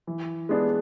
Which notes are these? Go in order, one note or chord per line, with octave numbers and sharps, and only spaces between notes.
E3
G#3 B3 D4 G#4